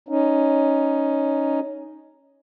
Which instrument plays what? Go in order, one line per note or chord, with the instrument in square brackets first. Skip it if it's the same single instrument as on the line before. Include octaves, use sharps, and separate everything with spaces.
[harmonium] C#4 D#4